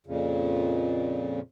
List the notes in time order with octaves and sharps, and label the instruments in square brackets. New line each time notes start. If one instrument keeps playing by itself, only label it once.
[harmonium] F2 A#2 C#3